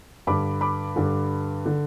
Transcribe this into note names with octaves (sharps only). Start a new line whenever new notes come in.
G2 D3 B5 D6
B5 D6
G2 D3
D3